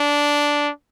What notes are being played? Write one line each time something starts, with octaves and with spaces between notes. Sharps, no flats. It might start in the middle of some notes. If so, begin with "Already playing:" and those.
Already playing: D4